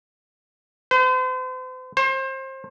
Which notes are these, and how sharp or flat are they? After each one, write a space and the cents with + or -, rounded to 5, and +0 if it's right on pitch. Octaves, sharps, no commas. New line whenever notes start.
C5 -40
C5 +30